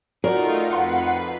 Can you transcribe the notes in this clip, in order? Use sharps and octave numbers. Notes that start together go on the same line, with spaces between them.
A3 D#4 F4 F#4 G#4 A#4 C#5 D5
F2 B4 F5 F#5 C6 C7